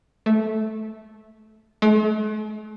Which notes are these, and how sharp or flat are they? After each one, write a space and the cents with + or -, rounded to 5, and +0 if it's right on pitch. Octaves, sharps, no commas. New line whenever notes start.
A3 -10
A3 -45